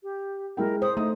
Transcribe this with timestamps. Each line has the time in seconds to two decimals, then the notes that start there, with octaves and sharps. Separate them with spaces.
0.03 G4
0.57 G#3 E4 A#4 G5
0.82 C5 D#6
0.97 A3 D#4 D#6